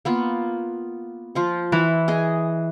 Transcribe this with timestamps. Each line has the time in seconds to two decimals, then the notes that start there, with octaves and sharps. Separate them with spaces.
0.05 A#3 B3 F4
1.35 F3 F4 C5
1.72 E3 E4
2.08 G#4 D#5 G#5